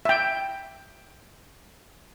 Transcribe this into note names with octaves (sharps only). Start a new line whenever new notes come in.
E5 G5